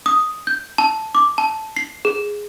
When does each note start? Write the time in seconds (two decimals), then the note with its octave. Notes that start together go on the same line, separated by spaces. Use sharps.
0.06 D#6
0.47 G6
0.78 A5
1.15 D6
1.38 A5
1.77 C7
2.05 G#4